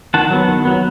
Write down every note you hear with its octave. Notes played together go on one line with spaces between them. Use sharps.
D#3 F#5 A5
F#3 B3
D#3
F#3 B3